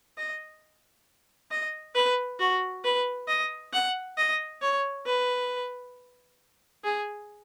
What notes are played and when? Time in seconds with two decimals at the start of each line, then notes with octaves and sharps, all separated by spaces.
0.18 D#5
1.51 D#5
1.95 B4
2.39 F#4
2.84 B4
3.28 D#5
3.73 F#5
4.18 D#5
4.62 C#5
5.06 B4
6.84 G#4